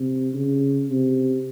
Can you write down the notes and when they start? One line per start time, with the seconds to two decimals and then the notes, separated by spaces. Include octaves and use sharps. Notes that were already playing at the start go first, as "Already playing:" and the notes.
Already playing: C3
0.34 C#3
0.90 C3